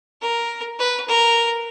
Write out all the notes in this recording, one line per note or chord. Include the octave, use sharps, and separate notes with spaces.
A#4
B4
A#4